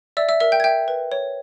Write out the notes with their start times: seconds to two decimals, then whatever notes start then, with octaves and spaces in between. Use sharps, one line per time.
0.17 D5 E5 E6
0.29 E5 E6
0.40 A#4 E5 E6
0.52 G5 G6
0.60 G#6
0.64 E5 G5 G6
0.88 B4
1.12 C#5